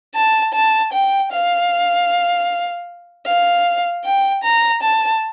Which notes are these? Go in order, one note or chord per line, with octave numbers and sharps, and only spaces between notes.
A5
A5
G5
F5
F5
G5
A#5
A5